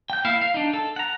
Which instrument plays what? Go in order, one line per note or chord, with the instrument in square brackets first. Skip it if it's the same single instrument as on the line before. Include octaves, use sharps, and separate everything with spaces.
[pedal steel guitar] G5 G6
A#3 E4 E5 F5 F6
F5
D4 D#4
A4
F#5 A#5